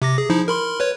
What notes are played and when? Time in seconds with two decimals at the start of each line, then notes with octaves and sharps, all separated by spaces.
0.02 C3 D6 A#6
0.18 G#4
0.30 F3 D#4 E4
0.48 A#4 B5 C6
0.80 B4 C#5